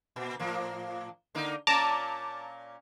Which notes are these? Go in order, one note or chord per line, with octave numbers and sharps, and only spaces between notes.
A#2
A2 F3 A#3
D3 A#3 D#4
A#2 A#3 C#4 A5 A#5 D6